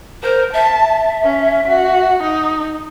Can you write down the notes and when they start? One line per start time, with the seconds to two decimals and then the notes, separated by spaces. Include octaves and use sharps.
0.23 A#4 C5
0.53 E5 A5
1.23 C#4
1.68 F#4
2.23 D#4